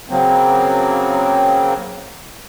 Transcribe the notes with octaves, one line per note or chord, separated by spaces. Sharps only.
C#3 F#3 A#3 C4